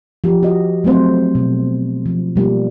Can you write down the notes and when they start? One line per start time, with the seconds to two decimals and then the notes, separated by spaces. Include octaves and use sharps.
0.24 F3 G4
0.43 F#4 G4 D#5
0.84 F#3 A3 C4 C5
1.35 B2
2.06 F3
2.36 B2 G3 A#3 F4